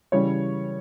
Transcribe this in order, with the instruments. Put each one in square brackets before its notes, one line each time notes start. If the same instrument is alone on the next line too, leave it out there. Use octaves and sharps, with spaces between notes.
[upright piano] C#3 E3 G3 C#5